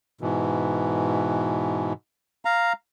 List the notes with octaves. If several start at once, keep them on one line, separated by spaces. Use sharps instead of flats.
G#2 B2 E3
F5 A#5